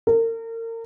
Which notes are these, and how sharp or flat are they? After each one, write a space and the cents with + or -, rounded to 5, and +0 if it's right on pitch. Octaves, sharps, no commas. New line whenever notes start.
A#4 -35